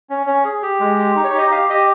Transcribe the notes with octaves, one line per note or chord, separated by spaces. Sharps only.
C#4
C#4
G#4
G4
G#3
G4
D#4
C#5
G4 D#5
G4 F5
G4 D#5